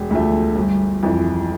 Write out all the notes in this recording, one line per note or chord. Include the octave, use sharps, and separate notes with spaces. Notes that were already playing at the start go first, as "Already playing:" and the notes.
Already playing: E1
D2 D3 F3 A3
G1
F2 E3